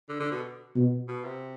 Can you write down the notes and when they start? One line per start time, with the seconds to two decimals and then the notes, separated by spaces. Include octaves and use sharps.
0.09 D3
0.20 D3
0.31 B2
0.75 B2
1.08 B2
1.25 C3